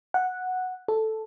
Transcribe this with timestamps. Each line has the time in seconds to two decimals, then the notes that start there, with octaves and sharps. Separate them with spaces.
0.14 F#5
0.88 A4